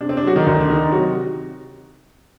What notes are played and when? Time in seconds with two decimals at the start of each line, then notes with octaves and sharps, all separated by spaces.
0.01 C3 D4
0.09 C4
0.17 D4
0.24 F#3 F#4
0.36 D#3 D#4
0.46 D2
0.60 D4
0.69 D#3 D#4
0.92 C3 F#3 F#4